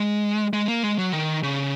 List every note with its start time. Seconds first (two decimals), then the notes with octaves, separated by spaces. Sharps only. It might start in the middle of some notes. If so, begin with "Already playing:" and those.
Already playing: G#3
0.53 G#3
0.68 A#3
0.83 G#3
0.98 F#3
1.13 D#3
1.43 C#3